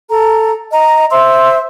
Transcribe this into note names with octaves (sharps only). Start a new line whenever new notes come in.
A4 A#5
D#5 A#5
C5 E5 C6 E6